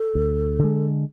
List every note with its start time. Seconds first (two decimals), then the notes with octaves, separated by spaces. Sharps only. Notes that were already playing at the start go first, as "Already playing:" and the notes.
Already playing: A4
0.15 D2
0.59 D3 G#3